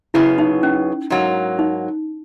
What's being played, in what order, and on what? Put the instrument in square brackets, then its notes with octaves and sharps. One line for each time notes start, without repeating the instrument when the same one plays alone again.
[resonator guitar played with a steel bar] F#2 C#3 F#3 B3 [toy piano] E4
[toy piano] D#4
C#4
[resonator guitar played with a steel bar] G#2 F#3 A#3
[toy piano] D#4